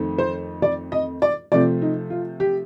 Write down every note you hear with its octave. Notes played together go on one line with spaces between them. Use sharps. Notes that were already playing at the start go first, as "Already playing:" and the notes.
Already playing: F2 D#3 A3 C4
C5
D5
D#5
D5
C3 F3 A3 C4 D5
D#4
F4
G4